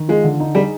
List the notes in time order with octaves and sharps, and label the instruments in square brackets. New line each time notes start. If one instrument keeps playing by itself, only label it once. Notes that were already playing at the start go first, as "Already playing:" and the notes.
Already playing: [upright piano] D#3
[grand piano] G#3 [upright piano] F4
[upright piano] D3
D#4
[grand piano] G3 [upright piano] G#4